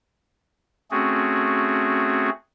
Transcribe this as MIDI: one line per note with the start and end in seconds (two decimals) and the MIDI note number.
0.91 2.30 57
0.91 2.30 60
0.91 2.30 61
0.91 2.30 66
0.91 2.30 68